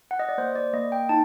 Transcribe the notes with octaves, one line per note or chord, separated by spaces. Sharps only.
F#5
D#5
D5
A#3 C5
D5
A#3 D#5
G5
D#4 A5